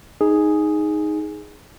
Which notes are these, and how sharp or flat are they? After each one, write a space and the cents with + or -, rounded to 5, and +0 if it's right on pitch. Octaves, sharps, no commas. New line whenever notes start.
D#4 +0 G#4 +0